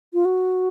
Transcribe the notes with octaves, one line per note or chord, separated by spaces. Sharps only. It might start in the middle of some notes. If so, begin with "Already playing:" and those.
F4
F#4